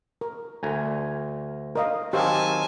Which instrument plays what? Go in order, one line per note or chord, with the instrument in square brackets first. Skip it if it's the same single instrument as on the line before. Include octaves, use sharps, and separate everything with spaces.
[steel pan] A#4
[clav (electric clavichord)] D2 G#5 A#5
[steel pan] A#4 D#5 F5
[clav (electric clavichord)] D#3 F#3 C4 [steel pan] G4 C5 F5 [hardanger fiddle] G#5 A5